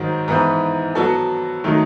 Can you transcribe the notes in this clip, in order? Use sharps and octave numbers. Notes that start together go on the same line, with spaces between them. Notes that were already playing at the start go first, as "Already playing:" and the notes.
Already playing: G#2 D#3 F#3
G#2 E3 B3 E4
F#3 B3 F#4 A4
D#3 F#3 A3 D#4